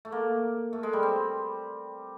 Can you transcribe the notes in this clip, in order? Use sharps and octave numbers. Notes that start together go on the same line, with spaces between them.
A3
A#3
A3
G#3
G3
C4